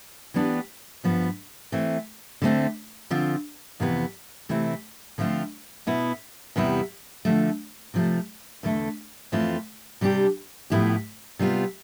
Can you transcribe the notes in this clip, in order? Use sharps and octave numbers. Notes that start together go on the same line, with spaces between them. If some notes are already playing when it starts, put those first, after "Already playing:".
E3 B3 D4 G4
G2 F3 B3
E3 A3 C4
D3 A3 C4
D3 F3 C4 F4
F2 C3 E3 B3
C3 E3 A3 C4 E4
D3 F3 A3 C4 F4
B2 B3 E4
E2 C3 G3 B3 E4
D3 F3 A3
C3 F3 A3
E2 D3 A3
F2 E3 A3 C4 F4
C3 G3 D4 G4
A2 F3 B3 E4 G4
C3 G3 B3 F4